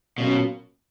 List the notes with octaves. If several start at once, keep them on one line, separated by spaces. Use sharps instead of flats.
B2 F#3 A#3 C#4 F4